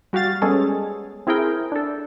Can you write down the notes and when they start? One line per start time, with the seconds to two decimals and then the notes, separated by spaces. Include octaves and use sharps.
0.13 G3 F#4 G4 F5 A6
0.42 G3 G#3 B3 C#4 G#4 A4
1.27 C4 E4 G#4 A#4 G5
1.72 D4 A4